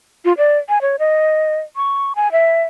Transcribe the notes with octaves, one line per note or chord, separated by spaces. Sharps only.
F4
D5
G#5
C#5
D#5
C#6
G#5
E5